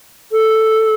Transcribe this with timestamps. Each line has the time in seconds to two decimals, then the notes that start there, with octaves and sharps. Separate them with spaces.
0.31 A4